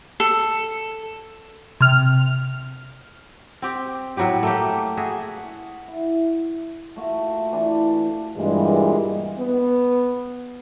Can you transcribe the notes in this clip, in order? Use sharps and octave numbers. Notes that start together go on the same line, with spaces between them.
A4
C3 F6
C4 G4 G5
A2 F#3 B3 G4
A3 A#3 G4
F#4 G#4 E5
F#5
E4
A3 A#3 F4 F#4
E3 D4 B4 D5
G2 A#2 E3 G3 G#3
B3